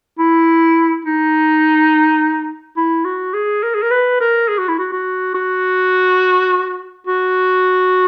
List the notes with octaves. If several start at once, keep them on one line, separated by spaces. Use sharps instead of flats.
E4
D#4
E4
F#4
G#4
A#4
G#4
A#4
B4
A#4
G#4
F#4
E4
F#4
F#4
F#4
F#4